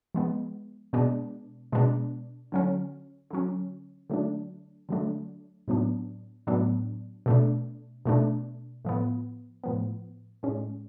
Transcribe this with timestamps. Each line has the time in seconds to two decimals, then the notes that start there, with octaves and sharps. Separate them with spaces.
0.15 F3 G#3 B3
0.93 B2 G#3 B3 D4
1.72 B2 G#3 B3 D4
2.52 D3 F#3 C#4
3.30 D3 F#3 C#4
4.10 D3 F#3 A3 D4
4.89 D3 F#3 A3 D4
5.68 A2 F#3 B3 D4
6.47 A2 F#3 B3 D4
7.26 B2 A3 D4
8.06 B2 A3 D4
8.85 A2 F3 B3
9.64 A2 F3 B3
10.43 A2 G#3 C#4